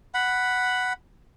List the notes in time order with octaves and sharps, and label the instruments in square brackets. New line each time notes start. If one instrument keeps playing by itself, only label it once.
[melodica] F#5 B5